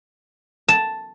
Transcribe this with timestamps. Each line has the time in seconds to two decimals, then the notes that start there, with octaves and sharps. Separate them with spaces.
0.69 A5